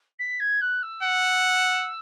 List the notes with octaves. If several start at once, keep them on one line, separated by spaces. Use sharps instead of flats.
B6
G#6
F#6
E6
F#5